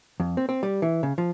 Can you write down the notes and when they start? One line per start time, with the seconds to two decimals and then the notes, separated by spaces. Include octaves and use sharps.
0.20 F2
0.37 C4
0.49 C4
0.63 G3
0.82 E3
1.03 C#3
1.18 F3